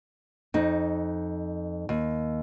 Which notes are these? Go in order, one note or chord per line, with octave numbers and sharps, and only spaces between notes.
F2 D#4
D#2